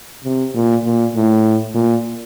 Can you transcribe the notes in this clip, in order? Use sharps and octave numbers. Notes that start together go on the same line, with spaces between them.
C3
A#2
A#2
A2
A#2